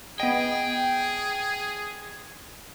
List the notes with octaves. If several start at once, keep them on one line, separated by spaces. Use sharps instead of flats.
B3 G#4 D#5 G5